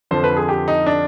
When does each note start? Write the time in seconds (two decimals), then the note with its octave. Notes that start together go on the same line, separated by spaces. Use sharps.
0.11 F2 D3 F3 C5
0.24 B4
0.37 G#4
0.49 G4
0.68 D#4
0.86 D4